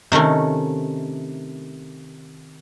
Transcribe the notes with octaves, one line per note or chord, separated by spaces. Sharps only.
C3 D#3 A3 C#4